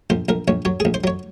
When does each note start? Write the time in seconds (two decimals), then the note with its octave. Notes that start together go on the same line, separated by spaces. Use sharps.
0.10 A#1 C5
0.29 A#1 A#4
0.48 A#1 C#5
0.65 F#3 C#5
0.80 A#1 G#4
0.94 C5
1.04 F#3 C#5